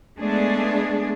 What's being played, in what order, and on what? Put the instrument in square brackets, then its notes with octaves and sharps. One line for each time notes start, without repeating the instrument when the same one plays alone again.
[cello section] G#3 A3 B3 D4 G#4